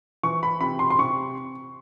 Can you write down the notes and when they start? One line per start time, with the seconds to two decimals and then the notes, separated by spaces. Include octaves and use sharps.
0.23 E3 C#6
0.43 B5
0.61 C3 B5
0.79 C6
0.90 C6
0.99 C3 C#6